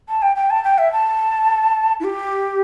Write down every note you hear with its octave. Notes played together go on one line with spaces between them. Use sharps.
A5
G5
G5
A5
G5
E5
A5
E4
G4